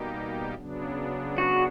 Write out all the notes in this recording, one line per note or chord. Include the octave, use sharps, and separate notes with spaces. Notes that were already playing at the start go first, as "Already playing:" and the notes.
Already playing: B2 G3 A#3 D#4 G4
C#3 F#3 B3 D4
F#4